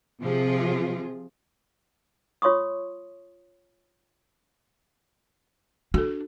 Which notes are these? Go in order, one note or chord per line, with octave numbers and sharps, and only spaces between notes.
C3 F3 F4 G#4
F4 C#5 C6 C#6 D#6
D4 F#4 A4